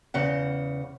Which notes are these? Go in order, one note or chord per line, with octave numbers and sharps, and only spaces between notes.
E2 C#3 F#5